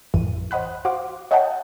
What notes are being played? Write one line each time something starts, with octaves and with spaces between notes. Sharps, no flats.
A1 F2 E3 D#7
C5 D#5 F#5 B5 F#6
F#4 C5 F5 D6
C#5 D#5 E5 F#5 G5 A5